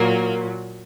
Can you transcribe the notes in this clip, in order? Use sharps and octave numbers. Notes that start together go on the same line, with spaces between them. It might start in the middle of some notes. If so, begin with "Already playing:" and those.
Already playing: A#2 F#3 A#3